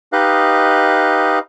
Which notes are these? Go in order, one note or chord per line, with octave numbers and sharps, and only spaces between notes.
D#4 G4 B4 D#5 F5 F#6